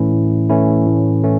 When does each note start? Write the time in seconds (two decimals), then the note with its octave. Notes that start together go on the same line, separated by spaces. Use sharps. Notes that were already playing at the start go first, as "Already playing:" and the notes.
Already playing: A2 E3 A3 C#4 E4
0.12 A2
0.49 E3 A3 C#4 E4
0.87 A2
1.24 E3 A3 C#4